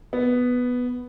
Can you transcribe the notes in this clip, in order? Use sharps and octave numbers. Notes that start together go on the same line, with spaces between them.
B3